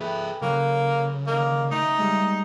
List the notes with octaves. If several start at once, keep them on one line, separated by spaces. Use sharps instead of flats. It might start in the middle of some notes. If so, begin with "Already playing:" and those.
G#4 A4 B4 E5 G5
C#3 F#3 A#3 F#4
D3 D#3 A#3
C#3 A3 D#4
G3 G#3